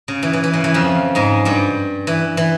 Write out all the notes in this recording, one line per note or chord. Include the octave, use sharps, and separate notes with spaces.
C#3
E3
E3
E3
C#3
E3
F2 F3
G#2 G#3
G2 G3
E3
E3